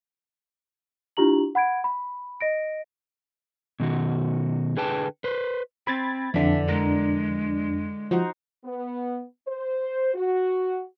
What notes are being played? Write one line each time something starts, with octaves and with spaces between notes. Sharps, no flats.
D4 E4 F4 G4 A#5 F#7
F#5 B5 G#6 D7
B5
D#5 A#6 D7
B2 D#3 F#4
D3 G#4 B4 G5 A5
B4 C5
C4 C5 B5 G#6 A6
F2 D3 E3 D4 E5
G#3 A#4
F3 D#4 F#4 C5
B3
C5
F#4